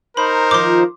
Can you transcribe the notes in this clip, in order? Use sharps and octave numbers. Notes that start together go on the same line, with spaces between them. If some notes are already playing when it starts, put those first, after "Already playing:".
D#4 A#4 C5 B5
D#3 F3 F4 C6 D6